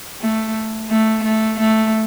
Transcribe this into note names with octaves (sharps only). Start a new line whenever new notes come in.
A3
A3
A3
A3